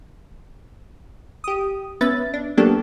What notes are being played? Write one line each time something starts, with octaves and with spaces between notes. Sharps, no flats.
G4 D#6
B3 C#4 B4 E5 A6
D4
F#3 A#3 B3 D4 G4 A4